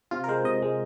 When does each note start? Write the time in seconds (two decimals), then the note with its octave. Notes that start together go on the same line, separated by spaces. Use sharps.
0.11 C3 F4
0.24 A#4
0.29 G#3 C5
0.45 C3 D#5
0.62 G#3